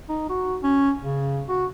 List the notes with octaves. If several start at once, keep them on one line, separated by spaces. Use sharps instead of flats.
D#4
F#4
C#4
C#3
F#4